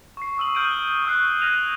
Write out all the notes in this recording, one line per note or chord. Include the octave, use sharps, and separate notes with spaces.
C#6 C7
C#6 D#6 E6 D#7 F#7
D#6 F6 G6 D7 D#7
G7
C#6 E6 F#6 C7
F6 G#6 A#6 D#7 F7